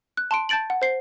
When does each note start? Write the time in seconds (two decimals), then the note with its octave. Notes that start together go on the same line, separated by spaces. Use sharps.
0.17 F#6
0.31 A5 C6 D7
0.49 A5 G6 A6 D7 F#7
0.70 F#5
0.82 C5 C7